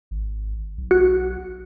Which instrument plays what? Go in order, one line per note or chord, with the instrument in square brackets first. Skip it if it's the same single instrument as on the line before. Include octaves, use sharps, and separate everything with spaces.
[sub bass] G#1
B1
[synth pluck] F#4